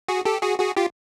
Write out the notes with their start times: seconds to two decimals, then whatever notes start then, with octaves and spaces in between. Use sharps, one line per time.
0.08 F#4 G#4
0.25 G4 A4
0.42 F#4 G#4
0.59 F#4 G#4
0.77 F4 G4